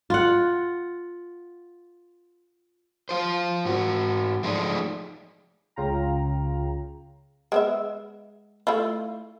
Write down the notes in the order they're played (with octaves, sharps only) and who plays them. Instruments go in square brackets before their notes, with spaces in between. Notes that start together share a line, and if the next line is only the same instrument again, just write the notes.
[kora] F4 F#5
[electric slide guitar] F4 C5
G#2 F#4
F3 G#3 A3 D#4 G#4 D5
[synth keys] C#2 C#3 F4 F5 G5 A#5
[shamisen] G#3 B3 E5
A3 E4 F4